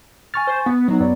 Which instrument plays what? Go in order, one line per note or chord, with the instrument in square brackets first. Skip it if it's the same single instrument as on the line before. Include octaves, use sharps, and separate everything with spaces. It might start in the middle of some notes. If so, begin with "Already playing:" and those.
[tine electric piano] G#5 C#6 A6 [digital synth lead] F6
[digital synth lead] C5
B3
[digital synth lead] F#3 [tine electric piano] B3 D#4
[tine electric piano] F#2 B3 D5